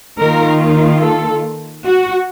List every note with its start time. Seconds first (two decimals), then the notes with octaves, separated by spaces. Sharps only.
0.19 D#3 A#3 F4 A#4
1.03 A4
1.86 F#4